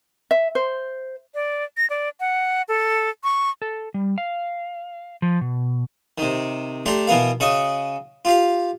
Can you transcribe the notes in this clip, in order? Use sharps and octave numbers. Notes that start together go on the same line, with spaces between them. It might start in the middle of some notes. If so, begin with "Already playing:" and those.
E5
C5
D5
A#6
D5
F#5
A4
C#6
A4
G3
F5
F3
B2
C3 D#3
A3 D4 G4 A#5 C6
B2 E3 B3 A#4 F5
C#3 F#4 D#5 C#6
F4 G4 F5